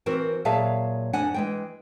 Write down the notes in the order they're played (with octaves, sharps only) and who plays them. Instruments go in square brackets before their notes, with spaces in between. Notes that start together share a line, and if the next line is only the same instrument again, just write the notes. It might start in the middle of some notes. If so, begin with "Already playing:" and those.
[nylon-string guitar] E3 C4 F#4 A#4 C5
A#2 F#3 G#4 E5 F5 A5
F2 D4 F#5 G#5
E3 G#3 G5